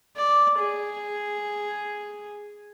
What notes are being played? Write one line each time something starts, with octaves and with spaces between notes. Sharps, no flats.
D5
G#4